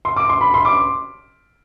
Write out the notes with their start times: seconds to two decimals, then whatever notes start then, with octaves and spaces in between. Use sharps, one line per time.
0.05 C6
0.16 D6
0.29 C6
0.41 B5
0.54 C6
0.65 D6